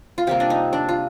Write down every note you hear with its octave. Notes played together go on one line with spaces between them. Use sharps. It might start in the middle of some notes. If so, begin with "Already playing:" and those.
F4
C3 G3 A#3 G4
D4
D#4
D4
F4